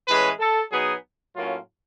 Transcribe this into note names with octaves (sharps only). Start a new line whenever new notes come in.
A2 E3 G#3 C#4 B4
A4
B2 F#3 B3 D#4 G#4
A2 F#3 A#3 C#4 F4